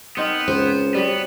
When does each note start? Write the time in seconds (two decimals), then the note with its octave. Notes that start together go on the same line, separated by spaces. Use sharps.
0.17 B3 C4 D#4 A#4
0.48 C#2 C5
0.94 F#3 G3 B3